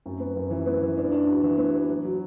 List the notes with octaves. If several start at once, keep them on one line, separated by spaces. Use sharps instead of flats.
F#2
B3
F#2
E3
B3
E3
D4
D4
F#4
E3
B3
F#4
F#3
F#3